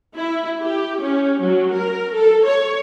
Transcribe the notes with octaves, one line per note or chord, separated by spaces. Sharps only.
E4
G4
C#4
F#3
A#4
A4
C#5